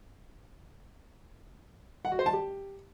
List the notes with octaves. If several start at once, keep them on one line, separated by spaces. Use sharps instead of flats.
F#5
F#4
C5
A5
G4